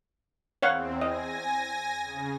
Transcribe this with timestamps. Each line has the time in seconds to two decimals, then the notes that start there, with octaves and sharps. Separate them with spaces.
0.62 E2 C4 C#5 F5 F#5
1.01 D#5 G#5 A#6
2.03 C#3